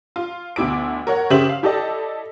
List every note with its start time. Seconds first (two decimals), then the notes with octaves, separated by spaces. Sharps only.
0.16 F4
0.56 D2 B2 E4 D6 D7
1.07 A#4 C#5 F#5
1.30 C#3 G4 C5 E5 F#7
1.49 F5
1.63 E4 G4 A4 D5 D#5 A5